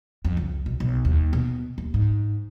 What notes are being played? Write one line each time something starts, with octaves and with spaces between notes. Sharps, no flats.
F2
C#2
B1
B1
D#2
B2
D#2
G#2